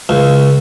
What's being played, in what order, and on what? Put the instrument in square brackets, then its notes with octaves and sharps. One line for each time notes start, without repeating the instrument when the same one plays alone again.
[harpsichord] C#2